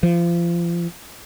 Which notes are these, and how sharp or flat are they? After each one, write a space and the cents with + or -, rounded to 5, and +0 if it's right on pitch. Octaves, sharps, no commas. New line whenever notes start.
F3 -30